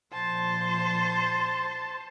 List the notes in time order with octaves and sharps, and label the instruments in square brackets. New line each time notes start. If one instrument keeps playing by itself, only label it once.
[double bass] A#2 F3 [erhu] C5 [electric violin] A5